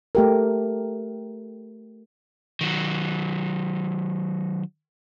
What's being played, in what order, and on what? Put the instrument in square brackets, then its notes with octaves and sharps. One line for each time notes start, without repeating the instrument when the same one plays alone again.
[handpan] A3 G4 A#4
[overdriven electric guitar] D#3 F#3